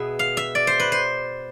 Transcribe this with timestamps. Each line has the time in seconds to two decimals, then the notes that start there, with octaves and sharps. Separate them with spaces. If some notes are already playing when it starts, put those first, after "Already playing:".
Already playing: B2 B3 G#4 E5
0.19 F5
0.37 E5
0.55 D5
0.67 C5
0.80 B4
0.92 C5